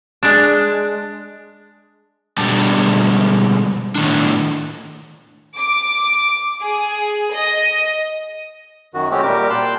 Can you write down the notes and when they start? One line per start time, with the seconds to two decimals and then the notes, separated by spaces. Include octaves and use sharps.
0.23 G#3 D4
2.38 B2 D3 G3 G#3 D4 A5
3.95 A2 D#3 D4
5.57 D6
6.61 G#4
7.34 D#5
8.94 F#2 D#3 F#4
9.11 G#3 A3 C4 C#4 F#4 G4
9.23 A#2 G3 G4 A#4 D6
9.50 A#2 G5 A5 C6 F#6